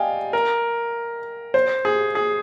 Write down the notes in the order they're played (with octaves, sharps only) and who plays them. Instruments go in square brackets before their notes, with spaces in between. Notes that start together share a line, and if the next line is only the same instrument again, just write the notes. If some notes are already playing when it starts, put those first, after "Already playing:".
Already playing: [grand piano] D5 D#5 F5 G5 G#5
A#4
C5
G#4
G#4